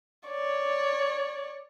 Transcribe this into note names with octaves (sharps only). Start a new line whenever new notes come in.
C#5 D5